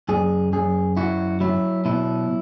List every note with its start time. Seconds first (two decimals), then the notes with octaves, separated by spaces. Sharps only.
0.09 F#2 G#4
0.53 F#2 G#4
0.97 E4 F#4
1.40 F#3 E4
1.85 B2 E4